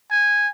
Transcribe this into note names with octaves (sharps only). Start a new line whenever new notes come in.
G#5